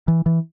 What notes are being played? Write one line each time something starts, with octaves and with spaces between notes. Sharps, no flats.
E3
E3